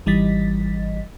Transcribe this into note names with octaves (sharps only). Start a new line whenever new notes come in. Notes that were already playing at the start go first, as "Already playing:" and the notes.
G#1 E3 G3 D#5 A6 B6